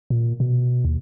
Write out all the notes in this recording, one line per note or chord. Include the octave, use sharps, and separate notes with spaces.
A#2
B2
D#2